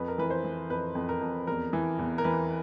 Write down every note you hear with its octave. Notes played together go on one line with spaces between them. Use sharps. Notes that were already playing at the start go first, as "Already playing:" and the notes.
Already playing: F2 B4
A#4
E3 B4
C5
E3
F2 B4
F2
A#4
F2
E2 A#4
E3
E2
A#4
E3 B4